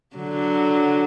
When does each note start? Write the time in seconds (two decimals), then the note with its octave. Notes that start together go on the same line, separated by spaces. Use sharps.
0.16 D3 F#3